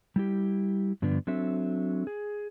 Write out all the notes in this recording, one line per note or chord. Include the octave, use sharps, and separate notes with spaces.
G3 E4 G4
G2 D3 F3 B3 D4
F#3 C4 D4 A4 E5
G#4